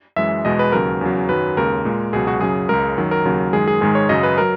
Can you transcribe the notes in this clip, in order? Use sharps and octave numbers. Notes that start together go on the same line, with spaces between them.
F#2 E3 G#3 E5
E2 B2 G#3 D#5
B4
D#2 C#3 F#3 A#4
E2 C#3 F#3
F#2 D#3 F#3 B4
D#2 C#3 G#3 A#4
A#2 G#3
C#2 B2 F#3 G#4
F#4
F#2 C#3 F#3 G#4
C#2 C#3 G#3 A#4
F#2 D#3 F#3
A#4
D#2 C#3 F#3
F#2 D#3 G#3 G#4
G#4
G#2 D#3 G#3 G#4
C#5
F#2 C#3 F#3 D#5
B4
F#3 A#4